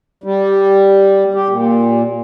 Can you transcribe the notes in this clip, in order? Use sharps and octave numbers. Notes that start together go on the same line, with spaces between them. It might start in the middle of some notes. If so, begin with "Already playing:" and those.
G3
G4
A#2